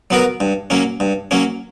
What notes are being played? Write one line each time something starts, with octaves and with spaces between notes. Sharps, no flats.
F#3 B3 F#4 A#4
G2
F#3 A#3 C#4
G2
F#3 A#3 C#4